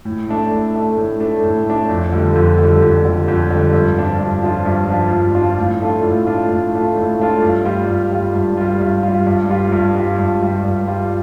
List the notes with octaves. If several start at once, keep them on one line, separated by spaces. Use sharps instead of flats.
A2
A3 D4
A2
A3 D4
A2
A3 D4
A2
A3 D4
F2
D3 G3
F2
D3
G3
F2
D3 G3
F2
D3 G3
G2
F3 D4 F4
G2
F3 D4 F4
G2
F3 D4 F4
G2
F3 D4 F4
A2
A3 D4 F4
A2
A3 D4 F4
A2
A3 D4 F4
A2
A3 D4 F4
G2
G3 F4
G2
G3 F4
G2
G3 F4
G2
G3 F4
G2
G3 F4
G2
G3 F4
G2
G3 F4
G2
G3 F4